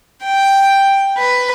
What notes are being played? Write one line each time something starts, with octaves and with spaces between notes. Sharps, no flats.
G5
B4